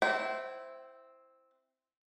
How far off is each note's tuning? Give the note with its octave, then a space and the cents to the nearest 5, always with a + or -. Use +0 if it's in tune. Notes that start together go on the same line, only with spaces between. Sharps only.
C4 +0 E4 +0 G5 -40